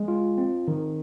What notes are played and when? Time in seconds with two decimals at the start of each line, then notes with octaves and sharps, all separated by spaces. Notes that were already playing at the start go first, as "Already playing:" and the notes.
Already playing: G#3
0.08 F4
0.38 C4
0.68 D#3